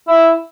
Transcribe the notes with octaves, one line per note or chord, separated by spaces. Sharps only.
E4